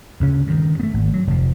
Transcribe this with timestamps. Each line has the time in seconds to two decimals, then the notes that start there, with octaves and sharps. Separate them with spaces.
0.20 D2 C#3 C#4
0.47 G2 D#3
0.80 A3 B3
0.94 G#1
1.14 F#3
1.27 F1 F3